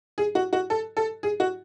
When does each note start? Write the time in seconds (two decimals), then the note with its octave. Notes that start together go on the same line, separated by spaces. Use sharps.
0.18 G#4
0.35 F#4
0.53 F#4
0.70 A4
0.97 A4
1.23 G#4
1.40 F#4